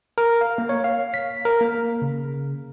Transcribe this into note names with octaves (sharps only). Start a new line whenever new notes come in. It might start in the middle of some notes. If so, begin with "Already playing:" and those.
A#4
F5
A#3
C#5
F5
B6
A#4
A#3
C#3